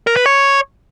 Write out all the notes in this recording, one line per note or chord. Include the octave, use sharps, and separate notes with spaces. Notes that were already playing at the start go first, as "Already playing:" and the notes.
A#4
B4
C#5